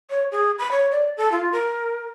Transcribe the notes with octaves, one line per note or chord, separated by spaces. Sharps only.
C#5
G#4
B5
C#5
D5
A4
F4
A#4